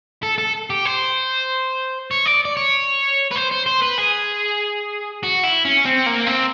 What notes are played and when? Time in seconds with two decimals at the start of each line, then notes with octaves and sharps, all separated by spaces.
0.23 A4
0.38 A4
0.70 G4
0.85 C5
2.11 C#5
2.26 D5
2.45 D5
2.57 C#5
3.31 B4
3.35 C5
3.51 C5
3.66 C5
3.82 B4
3.98 G#4
5.23 F#4
5.44 E4
5.65 C#4
5.85 C4
6.06 A#3
6.27 C4